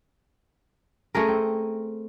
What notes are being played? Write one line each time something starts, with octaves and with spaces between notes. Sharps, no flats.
A3 C#4 G#4 A#4
C4